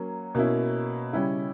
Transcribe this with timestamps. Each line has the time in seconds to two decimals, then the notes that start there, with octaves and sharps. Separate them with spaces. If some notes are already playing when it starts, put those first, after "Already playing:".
Already playing: F#3 A#3 C#4
0.35 B2 A#3 C#4 E4
1.13 C#3 G3 C#4 E4